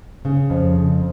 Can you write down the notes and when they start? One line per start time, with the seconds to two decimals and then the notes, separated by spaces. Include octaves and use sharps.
0.25 C#3
0.50 F2